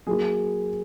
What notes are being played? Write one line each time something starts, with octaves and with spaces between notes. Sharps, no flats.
F#3 A#3 F#4 G#4